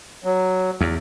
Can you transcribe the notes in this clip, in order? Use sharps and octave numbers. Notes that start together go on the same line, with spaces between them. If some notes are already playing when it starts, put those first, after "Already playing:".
F#3
E2